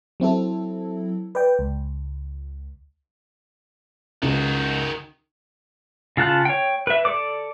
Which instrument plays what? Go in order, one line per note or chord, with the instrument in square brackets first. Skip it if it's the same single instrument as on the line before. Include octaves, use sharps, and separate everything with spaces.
[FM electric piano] F#3 C4 E4 A4
B4 D5 G5
C#2
[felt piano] C#2 [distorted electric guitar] D#3 F#4
[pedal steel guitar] C#3 F4 A5 F#6
C#5 G5
B4 E5
A4 D5 D6